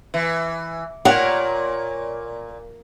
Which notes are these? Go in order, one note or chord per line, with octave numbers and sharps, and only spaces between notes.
E3
A#2 A#4 C#5 D5 F#5